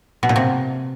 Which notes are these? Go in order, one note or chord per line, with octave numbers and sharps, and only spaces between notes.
B2
A#2
C3